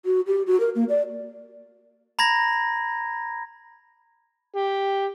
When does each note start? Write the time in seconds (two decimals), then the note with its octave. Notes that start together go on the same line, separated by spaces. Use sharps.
0.05 F#4
0.27 G4
0.47 F#4
0.60 A#4
0.75 A#3
0.89 D5
2.19 A#5 B5 G#6 A#6
4.55 G4